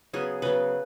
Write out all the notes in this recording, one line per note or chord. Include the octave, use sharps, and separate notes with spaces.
C#3 F#3 B3 G#4
C#3 F#3 B3 B4